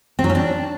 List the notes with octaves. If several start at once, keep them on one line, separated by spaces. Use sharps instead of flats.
C4
F#3
C#4
D4